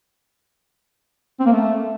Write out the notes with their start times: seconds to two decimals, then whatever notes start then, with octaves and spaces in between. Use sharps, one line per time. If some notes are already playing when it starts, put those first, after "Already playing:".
1.40 C4
1.46 A#3
1.52 A3